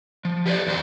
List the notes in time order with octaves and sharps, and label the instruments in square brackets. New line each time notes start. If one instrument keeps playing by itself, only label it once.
[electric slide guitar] F3
G4 B4 C5 D5
E2 F#3 C5